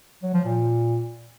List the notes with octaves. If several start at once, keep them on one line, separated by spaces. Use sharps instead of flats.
F#3
F3
A#2